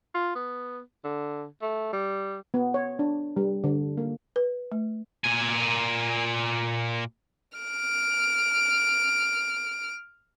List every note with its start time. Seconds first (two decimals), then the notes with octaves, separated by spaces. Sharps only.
0.15 F4
0.35 B3
1.04 D3
1.62 A3
1.93 G3
2.54 B3
2.74 C#5
2.99 D4
3.36 G3
3.64 D3
3.98 A#3
4.36 B4
4.72 A3
5.24 A#2 G#5
7.58 F6 D7